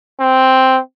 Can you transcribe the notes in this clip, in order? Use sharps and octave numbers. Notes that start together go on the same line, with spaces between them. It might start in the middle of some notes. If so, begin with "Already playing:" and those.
C4